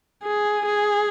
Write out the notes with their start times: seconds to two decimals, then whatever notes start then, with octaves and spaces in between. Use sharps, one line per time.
0.24 G#4
0.66 G#4